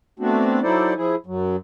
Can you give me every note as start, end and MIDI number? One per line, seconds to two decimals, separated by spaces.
0.19 0.60 57
0.19 0.60 59
0.19 0.60 60
0.19 0.60 62
0.19 0.60 66
0.63 0.94 54
0.63 0.94 63
0.63 0.94 64
0.63 0.94 69
0.63 0.94 72
0.63 0.94 74
0.96 1.15 53
0.96 1.15 64
0.96 1.15 68
1.26 1.56 42
1.26 1.56 54